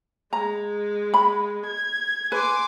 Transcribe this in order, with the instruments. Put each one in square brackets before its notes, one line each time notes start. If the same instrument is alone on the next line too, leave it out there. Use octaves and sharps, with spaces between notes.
[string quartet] G#3 [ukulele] A#5
[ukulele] B5
[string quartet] G#6
[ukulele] B4 [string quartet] G#5 C6 D6